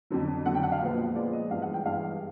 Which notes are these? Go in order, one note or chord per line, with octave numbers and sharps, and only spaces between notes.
F2 D3 F#3
F2 D3 F#3 F#5
G5
F#5
F5
A#2 F3 G#3 B3
A#2 F3 G#3 B3 D5
D#5
G2 E3 G#3 F5
F#5
G5
G2 E3 G#3 F5